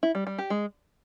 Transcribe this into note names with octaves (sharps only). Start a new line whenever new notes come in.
E4
G3
G3
G4
G#3